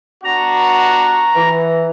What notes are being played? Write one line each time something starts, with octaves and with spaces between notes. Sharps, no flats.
B3 D4 F#4 A#5
E3